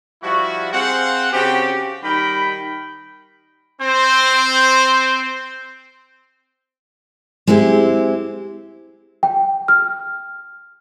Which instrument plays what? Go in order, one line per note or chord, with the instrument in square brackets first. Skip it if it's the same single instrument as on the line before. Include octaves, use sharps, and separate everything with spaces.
[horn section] F3 G3 E4 F#4
C4 G#4 C5 F5 F#5
C#3 C4 F#4 G4
D#3 G3 G5 B5
[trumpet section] C4 C5
[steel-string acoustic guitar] G#3 C4 E4 G4
[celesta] G5
F6